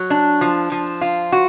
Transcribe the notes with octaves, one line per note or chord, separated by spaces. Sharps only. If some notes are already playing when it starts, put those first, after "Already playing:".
Already playing: F#3
D4
F3
F3
F4
F#4